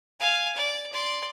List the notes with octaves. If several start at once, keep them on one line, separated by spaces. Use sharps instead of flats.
F5 G#5
D5
D5 C6